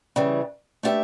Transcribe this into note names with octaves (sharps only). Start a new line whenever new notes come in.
C#3 E3 G3
A3 D4 G4 B4 E5